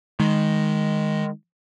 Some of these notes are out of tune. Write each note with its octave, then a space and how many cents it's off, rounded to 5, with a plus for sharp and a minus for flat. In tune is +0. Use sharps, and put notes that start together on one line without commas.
D#3 +0 G#3 +0